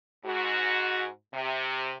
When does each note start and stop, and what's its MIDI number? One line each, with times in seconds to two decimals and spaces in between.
0.25 1.08 44
0.25 1.08 66
1.33 1.97 48